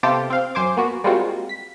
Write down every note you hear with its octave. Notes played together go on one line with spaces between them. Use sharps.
C3 B3 F4 G4 A4 C5
C4 F5
F#2 C5 G#5 D6
A#3 B3 F#4
G3 G#3 A#3 C4 F4 F#4
B6